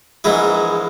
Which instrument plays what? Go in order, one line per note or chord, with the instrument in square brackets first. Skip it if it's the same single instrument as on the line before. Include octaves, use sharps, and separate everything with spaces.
[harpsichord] A#1 G#2 E3 G#3 E4